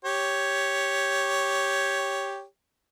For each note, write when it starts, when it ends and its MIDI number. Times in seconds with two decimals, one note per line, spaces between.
0.05 2.44 67
0.05 2.44 73